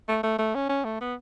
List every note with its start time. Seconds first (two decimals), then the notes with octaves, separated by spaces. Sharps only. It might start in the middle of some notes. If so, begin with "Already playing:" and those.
0.08 A3
0.23 A3
0.38 A3
0.55 C#4
0.69 C#4
0.84 A3
1.01 B3